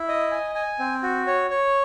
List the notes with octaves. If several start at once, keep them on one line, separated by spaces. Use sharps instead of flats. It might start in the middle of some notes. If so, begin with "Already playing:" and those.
Already playing: E4
D#5
G#5
G#5
C4
F#4
C#5
C#5